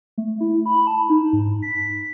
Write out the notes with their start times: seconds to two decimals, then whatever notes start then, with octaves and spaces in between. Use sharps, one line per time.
0.18 A3
0.41 E4
0.66 B5
0.87 A5
1.09 D#4
1.33 G#2
1.62 B6